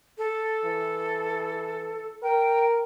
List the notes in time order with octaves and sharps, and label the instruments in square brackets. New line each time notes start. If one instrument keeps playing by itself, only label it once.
[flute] A4
[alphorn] E3
[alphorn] A#4 [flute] G5